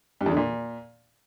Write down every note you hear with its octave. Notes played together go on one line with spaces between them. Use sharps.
G2
E2
D3
A#2